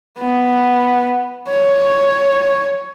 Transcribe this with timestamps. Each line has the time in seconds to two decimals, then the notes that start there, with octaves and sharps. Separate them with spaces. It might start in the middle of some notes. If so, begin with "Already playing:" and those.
0.19 B3
1.49 C#5